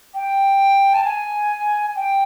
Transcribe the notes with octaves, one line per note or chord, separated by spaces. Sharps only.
G5
A5
G#5
G5